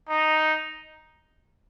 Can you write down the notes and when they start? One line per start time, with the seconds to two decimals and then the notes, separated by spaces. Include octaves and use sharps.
0.09 D#4